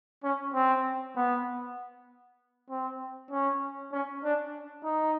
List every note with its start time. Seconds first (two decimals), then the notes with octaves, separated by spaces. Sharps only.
0.24 C#4
0.54 C4
1.16 B3
2.69 C4
3.31 C#4
3.92 C#4
4.24 D4
4.84 D#4